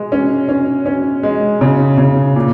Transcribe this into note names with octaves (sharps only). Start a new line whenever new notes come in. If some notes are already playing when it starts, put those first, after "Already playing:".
Already playing: G#3
C#4
C#4
C#4
G#3
C#3
C#3
A#2